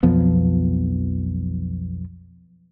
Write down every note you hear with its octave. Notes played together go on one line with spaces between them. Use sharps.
B1 F2 F3 B3